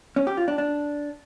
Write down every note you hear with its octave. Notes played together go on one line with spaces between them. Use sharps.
C#4
G4
F4
D4
D4